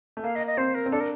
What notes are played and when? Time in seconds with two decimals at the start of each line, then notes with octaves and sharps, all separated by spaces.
0.17 A3
0.24 A#3 F5
0.36 D#5
0.47 D#5
0.57 C4 C5
0.75 A#4
0.86 C4
0.91 D4 A4
1.01 A#4